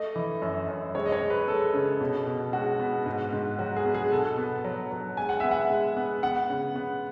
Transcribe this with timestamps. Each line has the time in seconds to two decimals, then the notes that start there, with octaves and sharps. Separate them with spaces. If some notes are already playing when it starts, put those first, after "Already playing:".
Already playing: A3 D#5
0.16 E3
0.42 F#2
0.68 F#2
0.95 G#3 C#5
1.06 D#5
1.12 C#5
1.21 G#3
1.30 B4
1.48 G#3 A4
1.74 C#3
2.01 B2
2.27 B2
2.53 G#3 F#4
2.80 B3
3.06 G#2
3.33 G#2
3.59 F#3 F#4
3.77 G#4
3.85 B3
3.95 G#4
4.12 B2 A4
4.38 B3
4.64 F#3
4.91 F#3
5.17 G#3 G#5
5.29 F#5
5.40 B3 E5
5.51 F#5
5.70 G#3
5.97 B3
6.23 B3 F#5
6.50 C#3
6.76 B3